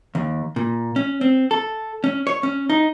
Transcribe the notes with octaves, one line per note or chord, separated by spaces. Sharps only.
D#2
A#2
C#4
C4
A4
C#4
C#5
C#4
D#4